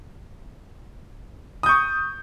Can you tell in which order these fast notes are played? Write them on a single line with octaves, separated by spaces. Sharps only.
D#6 G6 C#6